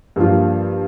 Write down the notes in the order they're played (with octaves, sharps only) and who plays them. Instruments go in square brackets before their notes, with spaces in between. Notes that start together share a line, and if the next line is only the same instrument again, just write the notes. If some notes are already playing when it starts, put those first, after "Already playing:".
[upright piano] G2 F3 A#3 F4